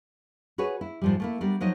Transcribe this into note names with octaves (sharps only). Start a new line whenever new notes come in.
F#4 G#4 B4 C#5
E4
G#2 F3 G3
A3 A#3 E4
G3 B3 D4 A#4
F3 F#3 D#4 D#5